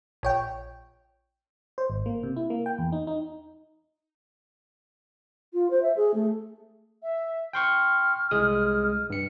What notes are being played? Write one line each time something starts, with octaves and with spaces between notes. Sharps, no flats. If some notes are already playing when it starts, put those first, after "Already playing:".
A#1 C#5 G5
C5
G#1
A#3
C3
E4
A#3
G5
E2
D#4
D#4
F4
C5
E5
G#4
A3
E5
G5 C6 C#6 F6
C2 G#3 D#6
G2 C#7